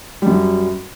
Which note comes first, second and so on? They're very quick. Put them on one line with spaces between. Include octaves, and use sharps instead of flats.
G3 F#2 F#3